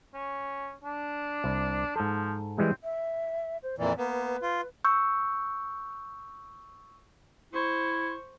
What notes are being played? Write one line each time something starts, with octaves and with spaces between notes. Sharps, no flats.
C#4
D4
C2
G#2 F3 A4
E3 G3 G#3 C4
E5
C5
F2 A#2 E3 D5
A#3 B3 B4
F4
C#6 E6 G6
E4 C5 C#6